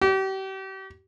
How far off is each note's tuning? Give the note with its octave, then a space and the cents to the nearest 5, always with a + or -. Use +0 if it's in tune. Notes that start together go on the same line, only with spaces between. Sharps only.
G4 -35